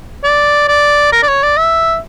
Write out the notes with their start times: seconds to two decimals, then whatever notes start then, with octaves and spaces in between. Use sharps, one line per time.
0.24 D5
0.68 D5
1.12 A#4
1.23 D5
1.28 C#5
1.43 D5
1.57 E5